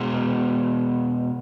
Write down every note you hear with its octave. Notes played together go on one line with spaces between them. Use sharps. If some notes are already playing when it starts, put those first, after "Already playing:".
Already playing: B2 G#3